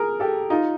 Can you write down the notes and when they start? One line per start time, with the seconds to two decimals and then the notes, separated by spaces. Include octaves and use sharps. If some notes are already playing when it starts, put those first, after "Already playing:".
Already playing: G#4 A#4
0.20 G4 A4
0.50 D#4 F4